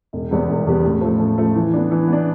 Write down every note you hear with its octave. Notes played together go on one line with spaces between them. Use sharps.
E1
E2 C3 G3 B3
E1
E2 C3 G3 B3
A2
F3 A3
A2
F3 A3
E3
B3 D4
E3
B3 D4